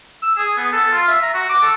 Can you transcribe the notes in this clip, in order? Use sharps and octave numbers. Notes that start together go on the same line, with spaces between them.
E6
G#4
B3
A4
F4
E5
A#5
F#4
D6
A4